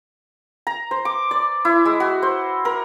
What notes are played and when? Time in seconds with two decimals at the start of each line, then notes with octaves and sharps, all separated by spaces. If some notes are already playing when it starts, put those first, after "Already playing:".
0.67 A#5
0.91 C5
1.05 D6
1.31 D5
1.65 E4
1.85 G#3
2.00 F#4
2.22 C5
2.65 A#4